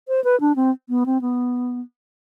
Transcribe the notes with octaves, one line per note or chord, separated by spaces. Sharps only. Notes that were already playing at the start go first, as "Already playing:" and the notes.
C5
B4
D4
C4
B3
C4
B3